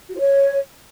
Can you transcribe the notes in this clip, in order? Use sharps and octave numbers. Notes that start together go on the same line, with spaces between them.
F#4
F4
C#5